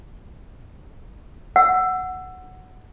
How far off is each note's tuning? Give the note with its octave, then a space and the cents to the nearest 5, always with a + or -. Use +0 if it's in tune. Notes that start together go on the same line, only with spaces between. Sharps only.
F#5 +0 E6 +15